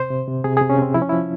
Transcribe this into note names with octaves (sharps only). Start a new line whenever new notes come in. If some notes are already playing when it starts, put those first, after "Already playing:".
Already playing: C3 C5
C3
C3
C3 G#4
C3 G#4
C#4
C3 C4
F3 E4
C#4
F3 E4